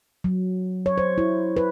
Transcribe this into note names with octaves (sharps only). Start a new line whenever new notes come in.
F#3
C#5
C5
E4
B4